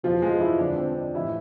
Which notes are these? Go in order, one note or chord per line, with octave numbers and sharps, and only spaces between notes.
E2 B2 F3 F4
G#3 G#4
E3 E4
E2 D3 F3 D4
C4
D4
A2 E3 F3 E4